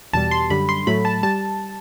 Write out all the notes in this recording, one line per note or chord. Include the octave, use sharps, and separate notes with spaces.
E2 B2 G3 A5
C6
F#2 D3 G3 B5
C6
A2 F#3 A3 B5
A5
G3 A5